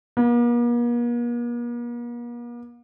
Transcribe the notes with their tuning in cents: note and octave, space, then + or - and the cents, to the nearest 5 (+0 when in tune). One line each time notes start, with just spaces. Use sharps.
A#3 +45